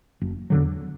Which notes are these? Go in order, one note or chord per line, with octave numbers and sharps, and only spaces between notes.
F#1
E2 D3 F#3